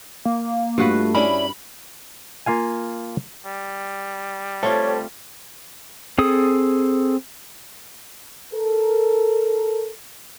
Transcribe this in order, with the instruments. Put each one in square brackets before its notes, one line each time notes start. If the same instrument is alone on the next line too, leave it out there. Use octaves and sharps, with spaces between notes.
[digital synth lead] A#3
[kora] G2 F#4 B4 [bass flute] A3 [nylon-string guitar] F4
[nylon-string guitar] C#4 D4 E4 [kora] A#4 [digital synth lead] B5
[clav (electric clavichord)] A#3 F4 F5 G#5
[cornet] G3
[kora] A3 C4 F4 [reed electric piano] A4 C5 A5 [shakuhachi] C#5
[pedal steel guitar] C4 G#4 A4 D#6
[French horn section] A4 A#4